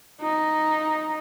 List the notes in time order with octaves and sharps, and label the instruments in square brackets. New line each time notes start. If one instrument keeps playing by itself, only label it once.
[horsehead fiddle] D#4